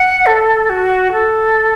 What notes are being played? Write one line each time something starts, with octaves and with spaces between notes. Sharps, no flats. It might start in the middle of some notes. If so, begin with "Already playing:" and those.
Already playing: F#5
A4
F#4
A4